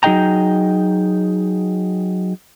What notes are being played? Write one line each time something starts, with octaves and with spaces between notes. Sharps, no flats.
F#3 D#4 G#4 D#5 G5 A#5